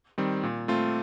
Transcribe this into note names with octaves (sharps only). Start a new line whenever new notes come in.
D#3 G3 C4
A#2
A3 C4 F4